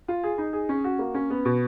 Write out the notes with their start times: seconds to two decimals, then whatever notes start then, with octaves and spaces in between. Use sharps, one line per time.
0.08 F4
0.23 G#4
0.38 D#4
0.53 G#4
0.69 C#4
0.84 F#4
0.99 A#3
1.14 C#4
1.30 B3
1.45 B2